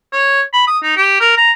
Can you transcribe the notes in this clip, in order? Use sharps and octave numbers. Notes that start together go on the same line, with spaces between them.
C#5
B5
D#6
D#4
G4
A#4
A#5